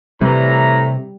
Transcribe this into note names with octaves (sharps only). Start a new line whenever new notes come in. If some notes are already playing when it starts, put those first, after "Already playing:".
A2 C3 E3 G3 A#5